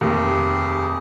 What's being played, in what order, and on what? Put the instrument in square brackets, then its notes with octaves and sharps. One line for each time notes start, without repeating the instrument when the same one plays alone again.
[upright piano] F1 D#2 [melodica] G4 G#4